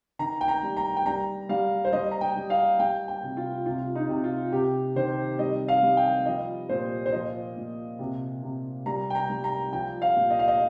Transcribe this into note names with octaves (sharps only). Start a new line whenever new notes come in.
D#3 A#5
G5
A#5
G3
A#5
G5
G3 A#5
G3 F5
C5
G3 D#5
A#5
G5
G3
F5
G3 G5
G5
C3
F4
C3 F4
D#4
C3
F4
C3 G4
D#3 C5
G3 D#5
F5
G3
G5
F3 D#5
A#2 C5
C5
F3 D#5
A#2
C3
C3
G3 A#5
G5
A#5
G3
A#5
F3 G5
F5
A#2
D#5
F5
D#5